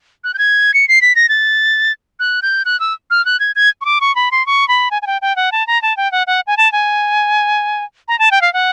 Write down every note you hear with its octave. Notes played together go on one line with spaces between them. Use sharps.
F#6
G6
G#6
C#7
C7
B6
A#6
A6
F#6
G6
F#6
E6
F6
F#6
G#6
G#6
C#6
D6
C#6
B5
C6
C#6
B5
G#5
G#5
G5
G5
F#5
A5
A#5
A5
G5
F#5
F#5
G#5
A5
G#5
A#5
A5
G5
F5
F#5